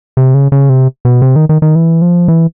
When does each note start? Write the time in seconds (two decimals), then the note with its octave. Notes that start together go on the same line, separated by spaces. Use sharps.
0.17 C3
0.34 C#3
0.52 C#3
0.69 C3
1.05 B2
1.22 C3
1.36 D#3
1.49 D#3
1.62 D#3
1.75 E3
2.02 F3
2.28 E3